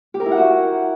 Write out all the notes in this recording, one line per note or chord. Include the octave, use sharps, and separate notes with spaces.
G4
A#4
E4
F#5
F#4